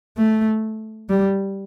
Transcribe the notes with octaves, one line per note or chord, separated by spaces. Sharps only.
A3
G3